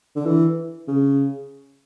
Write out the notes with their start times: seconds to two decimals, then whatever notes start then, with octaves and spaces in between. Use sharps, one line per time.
0.16 D3
0.26 E3
0.88 C#3